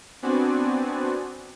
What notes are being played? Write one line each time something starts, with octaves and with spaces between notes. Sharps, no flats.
B3 C4 D4 F#4 D5 G#5